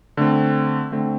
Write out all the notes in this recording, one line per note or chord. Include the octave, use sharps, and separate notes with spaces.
D3 A3 C4
D3 A3 C4